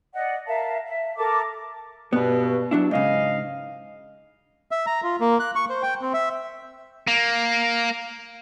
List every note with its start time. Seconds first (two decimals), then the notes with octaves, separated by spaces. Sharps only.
0.14 D5 D#5 F#5
0.46 A#4 E5 F5 A5
0.84 E5
1.17 A4 A#4 A5 D6
2.13 G2 B2 B3 B4
2.71 F#3 D4 E4
2.91 G#2 C#3 D#5 F5
4.71 E5
4.86 A#5
5.03 F4
5.20 A#3
5.40 F#6
5.56 C#6
5.70 C5
5.83 G5
6.01 C4
6.14 E5
7.07 A#3